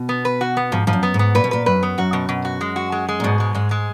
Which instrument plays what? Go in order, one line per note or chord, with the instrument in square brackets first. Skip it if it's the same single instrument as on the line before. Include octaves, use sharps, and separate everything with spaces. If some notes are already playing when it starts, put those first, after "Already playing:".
Already playing: [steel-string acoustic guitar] B2
[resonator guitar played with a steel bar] B3
B4
F#4
B3
[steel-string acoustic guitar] G#2 [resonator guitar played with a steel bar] F3
[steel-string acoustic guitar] G#2 [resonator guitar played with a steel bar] F3
[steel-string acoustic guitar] F#2
[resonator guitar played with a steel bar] B3
[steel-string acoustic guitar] G#2
[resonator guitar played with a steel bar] B3
[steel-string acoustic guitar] A#2 [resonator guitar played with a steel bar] B4
[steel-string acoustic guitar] B2
[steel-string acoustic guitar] A#2 [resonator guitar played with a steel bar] B4
[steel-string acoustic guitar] F#2 [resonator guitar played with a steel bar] B4
[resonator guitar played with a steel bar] B3
[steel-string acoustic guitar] F#2 [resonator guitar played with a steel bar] F#4
[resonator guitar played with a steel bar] B2
B2
F#4
G#3
F#4
G#3
G#3
[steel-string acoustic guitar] A#2
[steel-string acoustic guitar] G#2 [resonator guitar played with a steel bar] B2
[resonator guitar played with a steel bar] G#3
[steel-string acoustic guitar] G#2 [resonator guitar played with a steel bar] G#3
[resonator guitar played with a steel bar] G#3